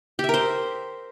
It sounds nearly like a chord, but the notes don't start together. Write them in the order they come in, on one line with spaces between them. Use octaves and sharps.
G4 E5 A#4 C5